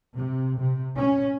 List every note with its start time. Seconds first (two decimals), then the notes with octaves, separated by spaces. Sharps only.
0.17 C3
0.61 C3
0.96 C#4